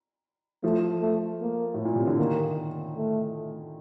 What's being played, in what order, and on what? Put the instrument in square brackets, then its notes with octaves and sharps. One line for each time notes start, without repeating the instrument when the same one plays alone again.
[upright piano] F3 [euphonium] A3
[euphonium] A3
A#3
[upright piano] A2
A#2
C3
D3
[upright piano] D#3 [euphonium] A#3
[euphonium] A3